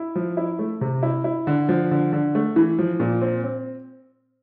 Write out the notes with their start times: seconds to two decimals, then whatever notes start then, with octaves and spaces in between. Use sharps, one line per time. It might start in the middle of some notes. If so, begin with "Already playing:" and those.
Already playing: E4
0.16 F3
0.37 E4
0.59 A3
0.81 C3
1.03 E4
1.24 E4
1.47 D3
1.69 F3
1.91 D3
2.13 D3
2.35 A3
2.56 E3
2.79 F3
3.00 A#2
3.22 C4
3.44 C4